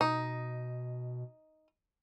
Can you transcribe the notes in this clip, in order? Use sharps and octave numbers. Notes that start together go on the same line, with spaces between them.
B2 D#4